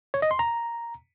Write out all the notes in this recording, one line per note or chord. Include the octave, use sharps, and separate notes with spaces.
C#5
D#5
C6
A#5